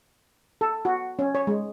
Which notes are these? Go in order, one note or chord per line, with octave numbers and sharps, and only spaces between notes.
A4
F#4
C#4
C#5
G#3